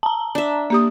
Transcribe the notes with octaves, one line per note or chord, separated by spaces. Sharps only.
A5 A#5
D4 E5
A#3 G4 D#6